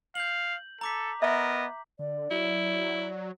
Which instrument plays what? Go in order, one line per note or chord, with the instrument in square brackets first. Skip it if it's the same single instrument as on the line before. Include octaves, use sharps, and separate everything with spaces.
[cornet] F5 [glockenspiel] G6 F#7
[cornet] A4 [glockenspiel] A#5 D6 B6
[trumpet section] B3 D#5 [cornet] A#4 [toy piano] E5
[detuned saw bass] D3 [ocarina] D5
[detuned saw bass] F#3 [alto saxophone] E4